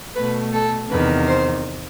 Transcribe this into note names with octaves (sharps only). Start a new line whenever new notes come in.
B2 A3 B4
A4
E2 C3 D#3 B4
C5